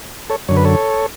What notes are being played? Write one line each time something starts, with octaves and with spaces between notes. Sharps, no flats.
A4 C#5
F#2 D3 C#5
B4
A4 C#5